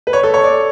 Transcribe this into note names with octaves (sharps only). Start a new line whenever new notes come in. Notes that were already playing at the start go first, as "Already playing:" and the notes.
B4
C#5
A4
C#5
D5